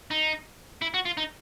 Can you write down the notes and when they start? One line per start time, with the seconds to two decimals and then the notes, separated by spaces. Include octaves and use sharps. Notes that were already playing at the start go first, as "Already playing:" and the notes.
0.11 D#4
0.82 E4
0.94 F#4
1.05 F4
1.17 D#4